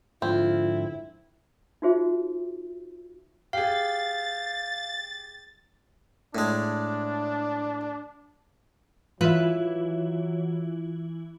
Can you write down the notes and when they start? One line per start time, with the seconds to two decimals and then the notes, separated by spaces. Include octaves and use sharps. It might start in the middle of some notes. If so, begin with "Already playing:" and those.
0.22 G#2 D3 F3 C4 E4 F4
1.82 D#4 F4 F#4 G#4 C5 E5
3.53 G4 G#4 F5 A6
6.35 A2 G#3 D4
9.21 E3 F#3 E4 F4 B4 E5